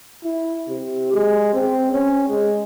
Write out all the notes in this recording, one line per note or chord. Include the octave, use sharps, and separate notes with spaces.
E4
C3
G#3
C4
C#4
G#3